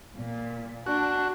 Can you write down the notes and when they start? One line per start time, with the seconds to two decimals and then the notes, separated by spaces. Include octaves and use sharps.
0.16 A#2
0.86 D4 F#4